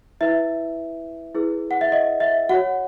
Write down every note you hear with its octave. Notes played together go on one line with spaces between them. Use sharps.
E4 B4 E5
E4 G#4 B4
F#5
E5
D#5
E5
F#4 C#5 F#5